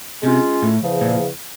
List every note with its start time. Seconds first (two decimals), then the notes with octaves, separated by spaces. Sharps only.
0.22 C3 G#3 C#4 F4
0.62 A2
0.81 E2 C#3 F3
1.01 A#2